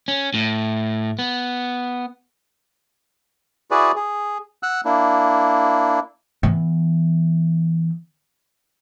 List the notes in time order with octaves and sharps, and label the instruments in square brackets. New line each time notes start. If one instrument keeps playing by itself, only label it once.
[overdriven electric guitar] C#4
A2
B3
[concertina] E4 F#4 G#4 B4 D5
G#4
F#5 E6 F#6
A#3 D4 E4
[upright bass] E3 B3